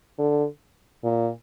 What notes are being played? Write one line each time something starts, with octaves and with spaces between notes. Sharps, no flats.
D3
A#2